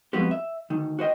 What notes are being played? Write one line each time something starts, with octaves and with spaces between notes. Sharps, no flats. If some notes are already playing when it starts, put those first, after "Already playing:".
F3 G#3 B3 C4 F#4 G4
E5
D2 D#3
F#4 C5 D#5 G5